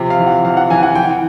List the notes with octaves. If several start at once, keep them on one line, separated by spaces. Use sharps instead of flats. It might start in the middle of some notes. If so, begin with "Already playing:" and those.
Already playing: C3 F3
F5
E3
F#5
E3 F5
F#5
E3 G#5
F#5
E3 G5